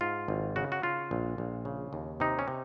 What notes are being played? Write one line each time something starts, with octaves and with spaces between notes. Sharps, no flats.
G#2 F4
G#1
C#3 F#4
F#4
C#3 F4
A#1
A#1
C#3
D#2
C3 D#4
C#4
C3